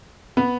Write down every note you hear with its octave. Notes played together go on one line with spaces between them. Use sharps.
B3